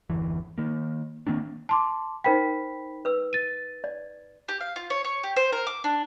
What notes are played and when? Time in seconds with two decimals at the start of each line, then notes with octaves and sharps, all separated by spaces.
0.10 G1 E2 E3
0.58 D#3 A#3
1.27 D#3 A#3 C4 D4
1.69 A5 C6 D6
2.24 D#4 A#4 C5 G5 B5 B6
3.05 B4 E6
3.33 A6 D#7
3.84 D5
4.48 G4
4.61 F5
4.76 F4
4.90 C#5
5.04 C#5
5.23 G4
5.36 C5
5.52 A#4
5.67 D6
5.84 D4